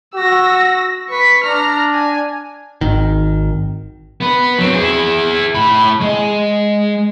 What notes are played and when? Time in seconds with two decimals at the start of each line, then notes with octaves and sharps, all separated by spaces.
0.15 F#4 E6 A#6
1.10 B4 C#6 B6
1.44 D4 A#5 F6
1.94 G#5
2.81 G#1 D#3
4.21 B3 B4
4.59 F#3 C4
4.74 E4 G#4
5.55 A2 B5
6.01 G#3